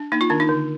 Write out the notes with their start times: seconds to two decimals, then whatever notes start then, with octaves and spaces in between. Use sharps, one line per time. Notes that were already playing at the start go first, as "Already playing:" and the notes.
Already playing: D4
0.12 A#3 D#4
0.21 F4
0.30 D#3 D4
0.40 D#4
0.49 D3